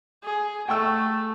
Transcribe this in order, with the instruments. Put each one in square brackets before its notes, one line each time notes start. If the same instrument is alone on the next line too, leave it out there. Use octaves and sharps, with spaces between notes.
[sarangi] G#4
[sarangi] A3 [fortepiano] G5 C#6 E6